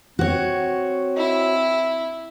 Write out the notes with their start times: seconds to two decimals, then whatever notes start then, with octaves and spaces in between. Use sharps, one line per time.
0.19 C4 F#4 C#5
1.17 E4